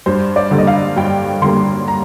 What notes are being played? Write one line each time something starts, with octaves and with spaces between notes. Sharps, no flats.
G2 C5
D5
D3 G3 A#3
D#5
F5
G2 G5
D3 G3 A#3 C6
A#5